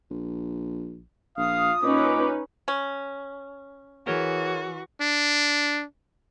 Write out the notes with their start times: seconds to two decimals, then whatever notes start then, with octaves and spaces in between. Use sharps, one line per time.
0.11 A#1
1.37 A#1 F4 F5 D#6
1.83 A#2 C#4 D#4 B4 D6
2.68 C#4
4.07 E3 F#4 G#4 A#4 C#5
5.01 D4